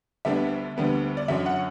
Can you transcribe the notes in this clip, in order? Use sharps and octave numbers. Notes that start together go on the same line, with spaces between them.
D2 D3 G3 B3 D4 E5
D2 D3 G3 B3 D4
D5
F#2 D3 F#3 C#4 E5
F#5